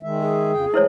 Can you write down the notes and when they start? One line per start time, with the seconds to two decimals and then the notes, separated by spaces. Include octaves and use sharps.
0.03 D#3 G#3 E5
0.21 G#4
0.52 F2 C#3 G5
0.74 E3 G#3 A3 E4 C5 C#5